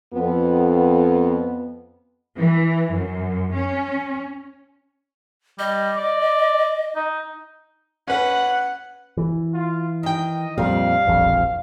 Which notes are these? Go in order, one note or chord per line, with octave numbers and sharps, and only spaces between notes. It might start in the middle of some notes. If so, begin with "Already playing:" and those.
F2 B3
E3
F#2
C#4
G3 D#5
D5
D#4
C#4 B4 F#5
E3
F4
D#3 D#5 G5
F2 A#2 G3 F5
E1 A#1 F2